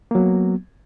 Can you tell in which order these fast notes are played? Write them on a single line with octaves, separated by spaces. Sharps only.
A#3 F#3 B3